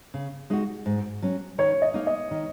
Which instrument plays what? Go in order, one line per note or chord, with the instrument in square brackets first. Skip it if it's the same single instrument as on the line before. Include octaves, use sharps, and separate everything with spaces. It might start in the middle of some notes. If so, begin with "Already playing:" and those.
[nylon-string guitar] C#3
G#3 D#4 F#4
G#2
F#3 C#4
[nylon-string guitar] D#3 [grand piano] C#5
[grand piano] D#5
[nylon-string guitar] A#3 D#4
[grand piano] D#5
[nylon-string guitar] D#3